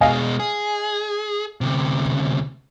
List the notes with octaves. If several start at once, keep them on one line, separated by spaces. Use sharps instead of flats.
B2 G#3 D#5 F5 G#5
G#4
D2 C3